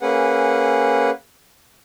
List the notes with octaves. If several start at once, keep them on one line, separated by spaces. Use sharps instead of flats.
A#3 C#4 G#4 B4 F#5